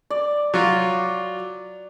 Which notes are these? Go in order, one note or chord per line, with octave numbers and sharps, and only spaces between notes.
D5
F#3 F4